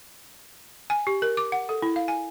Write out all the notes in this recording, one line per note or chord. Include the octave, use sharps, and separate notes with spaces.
G#5
G4
A#4
D6
F#5
A4
E4
F5
G#5